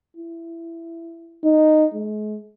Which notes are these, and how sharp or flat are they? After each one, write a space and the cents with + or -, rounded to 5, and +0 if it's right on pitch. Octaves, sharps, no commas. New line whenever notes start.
E4 +15
D#4 -10
G#3 +40